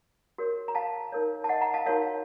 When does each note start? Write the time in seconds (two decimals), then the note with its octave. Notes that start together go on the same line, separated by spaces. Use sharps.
0.38 F#4 A#4 C#5
0.68 A#5
0.75 F5 A5
1.12 D#4 A#4 C#5
1.44 A5
1.49 D#5 F#5
1.61 F#5 A#5
1.74 F5 A5
1.86 D#4 F#4 A#4 C#5 F5